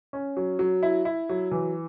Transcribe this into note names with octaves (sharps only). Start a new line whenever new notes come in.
C#4
F#3
F#3
E4
E4
F#3
E3